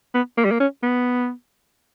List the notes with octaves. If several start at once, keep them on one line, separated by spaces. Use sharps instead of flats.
B3
A#3
G3
A#3
C#4
B3